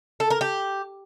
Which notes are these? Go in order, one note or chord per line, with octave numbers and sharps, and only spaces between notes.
A4
A#4
G4